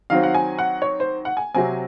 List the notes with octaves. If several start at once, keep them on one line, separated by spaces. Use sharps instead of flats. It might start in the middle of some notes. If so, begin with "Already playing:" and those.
D#3 F#3 C4 F5
F#5
G#5
F#5
C#5
C5
F#5
G#5
C3 F#3 C4 G#5